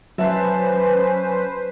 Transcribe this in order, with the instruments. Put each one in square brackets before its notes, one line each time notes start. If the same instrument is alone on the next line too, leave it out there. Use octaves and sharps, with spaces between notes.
[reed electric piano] F#3 [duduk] C#4 [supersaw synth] B4 C5 [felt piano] E5 A5